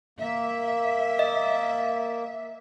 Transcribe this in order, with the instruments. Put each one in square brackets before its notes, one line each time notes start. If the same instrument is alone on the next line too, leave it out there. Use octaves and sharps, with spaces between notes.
[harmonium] A#3 [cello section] E5
[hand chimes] D#5